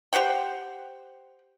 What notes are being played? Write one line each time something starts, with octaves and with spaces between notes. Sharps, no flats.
G4 C5 F#5 G5